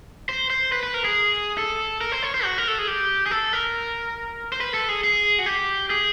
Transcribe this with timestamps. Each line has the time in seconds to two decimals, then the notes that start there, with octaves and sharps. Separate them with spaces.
0.29 C5
0.50 C5
0.72 B4
0.83 B4
0.94 A#4
1.04 G#4
1.58 A4
2.01 A#4
2.12 C5
2.23 C#5
2.34 C5
2.44 F#4
2.58 A#4
2.68 A4
2.79 G#4
2.88 G4
3.26 G#4
3.31 A4
3.53 A#4
4.52 C5
4.61 B4
4.74 A4
4.89 G#4
5.04 G#4
5.39 F#4
5.46 G4
5.90 G#4